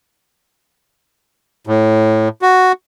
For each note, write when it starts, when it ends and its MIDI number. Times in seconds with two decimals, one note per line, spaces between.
1.67 2.29 45
2.42 2.72 66